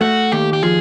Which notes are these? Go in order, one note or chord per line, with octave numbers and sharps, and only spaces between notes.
A3 F#4
D#2 G4
G4
F3 G#4